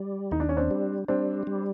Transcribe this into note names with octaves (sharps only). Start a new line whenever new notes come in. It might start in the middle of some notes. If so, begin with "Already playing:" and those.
Already playing: G3
D#2 D#4
D4
C#4
C4 D4
G3
G3 C4 D4
G3